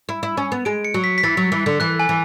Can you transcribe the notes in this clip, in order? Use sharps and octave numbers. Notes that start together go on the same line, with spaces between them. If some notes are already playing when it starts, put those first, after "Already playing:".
E4
E4
C#4
B3
G#3 D7
C#7
F#3
B6
B6
E3 A6
F#3
E3
D3
E3 F#6
G#5
E3